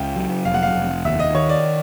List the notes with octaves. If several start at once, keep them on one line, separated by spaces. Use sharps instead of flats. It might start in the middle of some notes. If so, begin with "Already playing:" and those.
Already playing: C#2 C#3 E5 F5 G5
F#3
F1 F5
F#5
F5
F1
D#2 E5
D#5
D#3 C#5
D5